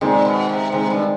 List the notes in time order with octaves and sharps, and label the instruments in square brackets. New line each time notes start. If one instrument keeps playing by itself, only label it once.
[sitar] A#2 [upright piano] D#3 G#3 C4
[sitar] B2
C3
[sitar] C3 [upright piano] D#3 G#3 C4
[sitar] G2